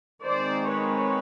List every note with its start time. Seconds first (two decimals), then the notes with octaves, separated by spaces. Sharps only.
0.23 D#3 G#3 C4 C5 D5
0.70 B4 C#5